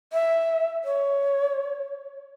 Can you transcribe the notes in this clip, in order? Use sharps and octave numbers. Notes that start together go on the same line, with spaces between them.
E5
C#5